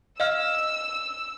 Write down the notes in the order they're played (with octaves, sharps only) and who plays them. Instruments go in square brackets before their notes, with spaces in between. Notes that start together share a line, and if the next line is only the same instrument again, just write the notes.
[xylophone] D#5 F5 F6 [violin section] E6